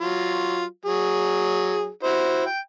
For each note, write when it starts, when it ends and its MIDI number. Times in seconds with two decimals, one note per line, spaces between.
0.01 0.64 54
0.01 0.64 65
0.85 1.88 54
0.85 1.88 68
2.03 2.45 64
2.03 2.45 66
2.03 2.45 72
2.46 2.59 79